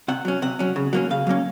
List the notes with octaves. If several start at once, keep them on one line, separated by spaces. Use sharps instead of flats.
C3 F#5
F#3 C#4
C3 F#5
F#3 C#4
C#3
F#3 A#3 C#4
C#3 F5
F#3 A#3 C#4